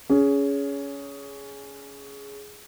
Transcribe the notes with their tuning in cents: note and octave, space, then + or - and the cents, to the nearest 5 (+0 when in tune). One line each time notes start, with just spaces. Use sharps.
C#4 +20 G#4 +5